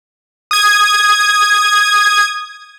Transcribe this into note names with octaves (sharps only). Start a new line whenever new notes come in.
D#6 G#6